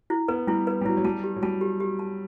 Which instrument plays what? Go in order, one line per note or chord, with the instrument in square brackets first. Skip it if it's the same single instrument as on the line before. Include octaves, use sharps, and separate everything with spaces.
[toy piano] E4
[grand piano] B3 [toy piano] B4
[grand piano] G3 [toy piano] E4
[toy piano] B4
[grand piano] G3
[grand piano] F#3 [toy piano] E4
[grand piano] F#3
[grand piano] G3 [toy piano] A5
[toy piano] G4
[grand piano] F#3
[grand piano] G3 [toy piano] A5
[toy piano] G4
G4
A5